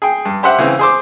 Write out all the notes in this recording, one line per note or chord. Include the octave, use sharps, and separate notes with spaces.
G#4 G5
G2
G4 C5 E5 F#5
C#3 E3 C4
G#4 C5 D6